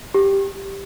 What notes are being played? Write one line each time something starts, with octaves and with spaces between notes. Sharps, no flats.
G4